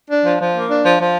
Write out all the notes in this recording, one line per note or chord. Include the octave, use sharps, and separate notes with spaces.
D4
F3
F3
A#3
D4
F3
F3